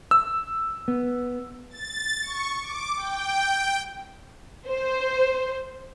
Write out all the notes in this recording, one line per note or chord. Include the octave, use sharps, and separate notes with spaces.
E6
B3
A6
C#6
D6
G5
C5